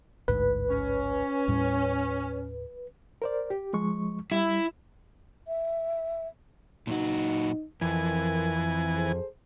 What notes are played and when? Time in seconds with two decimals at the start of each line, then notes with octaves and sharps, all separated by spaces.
0.28 A1 D2 G#2 B4
0.70 C#4
1.48 D#2 A2 G3
3.22 A#4 C5 D5
3.50 G4
3.73 F3 G#3 C#6
4.32 G3 E4
5.48 E5
6.87 A#2 F#3 D#4 F#4
7.81 F2 E3 A#4 G#5
8.95 G#4 A4 C5